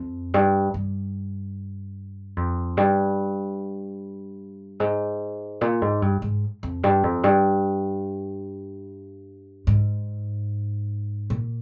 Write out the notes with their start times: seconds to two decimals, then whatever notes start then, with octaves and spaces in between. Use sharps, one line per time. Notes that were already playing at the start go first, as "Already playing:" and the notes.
Already playing: F2
0.34 G2
0.74 G2
2.37 F2
2.77 G2
4.80 G#2
5.61 A#2
5.82 G#2
6.02 G2
6.22 G#2
6.63 F2
6.83 G2
7.03 F2
7.24 G2
9.67 G#2
11.30 A#2